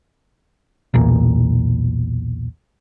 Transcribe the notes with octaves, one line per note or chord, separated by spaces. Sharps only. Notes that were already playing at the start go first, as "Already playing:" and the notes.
B1 E2 A#2